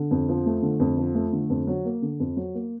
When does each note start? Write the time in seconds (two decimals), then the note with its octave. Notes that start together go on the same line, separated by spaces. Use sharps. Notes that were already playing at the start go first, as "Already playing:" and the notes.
Already playing: D3
0.11 F2
0.29 F3
0.46 A3
0.62 D3
0.80 F2
0.97 F3
1.14 A3
1.32 D3
1.50 F2
1.67 F#3
1.85 A#3
2.02 D3
2.20 F2
2.37 F#3
2.54 A#3